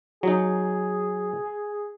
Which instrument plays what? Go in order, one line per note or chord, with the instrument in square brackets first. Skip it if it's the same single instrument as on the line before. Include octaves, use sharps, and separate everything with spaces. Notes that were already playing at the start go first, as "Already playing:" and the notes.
[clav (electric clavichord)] F#3 D#4 [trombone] G#4